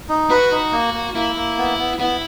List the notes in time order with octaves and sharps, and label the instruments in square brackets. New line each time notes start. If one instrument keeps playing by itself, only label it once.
[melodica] D#4
[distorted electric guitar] F#4 [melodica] B4
[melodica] D#4
A#3
A#3
[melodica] A#3 [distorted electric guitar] E4
[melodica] A#3
B3
B3
[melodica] B3 [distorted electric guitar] E4